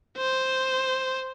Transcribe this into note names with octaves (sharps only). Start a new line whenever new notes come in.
C5